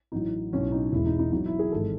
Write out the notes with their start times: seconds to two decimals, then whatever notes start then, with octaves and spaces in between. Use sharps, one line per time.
0.12 A1 A2 F#3 D#4
0.53 B1 A2 F#3 C#4
0.72 D#4
0.92 E1 E2 B2 G#3 E4
1.06 D#4
1.19 D#4
1.32 E2 B2 F#3 D#4
1.46 E4
1.59 G#4
1.72 G#1 G#2 E3 G#3 A4